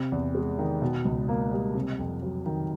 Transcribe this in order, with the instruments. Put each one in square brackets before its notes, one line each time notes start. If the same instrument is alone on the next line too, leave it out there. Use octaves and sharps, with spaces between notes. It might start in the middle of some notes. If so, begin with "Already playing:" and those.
Already playing: [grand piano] C3
E2
G#3
D#3
B2
C#2
A#3
G3
C3
F2
F#3
D#3